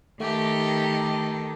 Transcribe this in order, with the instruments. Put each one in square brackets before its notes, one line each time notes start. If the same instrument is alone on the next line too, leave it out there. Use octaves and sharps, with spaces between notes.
[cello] D#3 [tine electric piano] A3 [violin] G4 A4